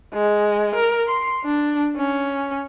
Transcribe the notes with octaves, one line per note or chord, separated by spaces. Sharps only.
G#3
A#4
C6
D4
C#4